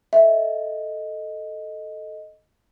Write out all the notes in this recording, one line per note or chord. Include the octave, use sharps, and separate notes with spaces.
A4 D#5 E5